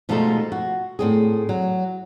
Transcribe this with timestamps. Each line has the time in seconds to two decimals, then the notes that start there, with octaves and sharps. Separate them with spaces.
0.09 B2 F3 G#3 A3 D#4 A4
0.52 F#4
0.99 A2 C4 G#4
1.49 F#3